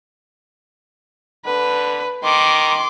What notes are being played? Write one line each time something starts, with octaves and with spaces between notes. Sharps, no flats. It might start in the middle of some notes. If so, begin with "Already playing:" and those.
D3 B4
D#3 C6 D6